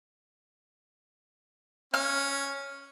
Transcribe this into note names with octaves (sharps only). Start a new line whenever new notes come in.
C#4 F6